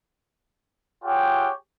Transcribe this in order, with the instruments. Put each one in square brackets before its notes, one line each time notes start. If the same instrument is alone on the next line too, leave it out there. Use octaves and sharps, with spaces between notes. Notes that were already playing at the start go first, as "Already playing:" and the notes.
[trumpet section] F4 G4 G#4 C#5 F#5 G5